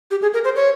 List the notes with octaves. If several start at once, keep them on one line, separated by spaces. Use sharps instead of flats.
G4
G#4
A#4
C5
C#5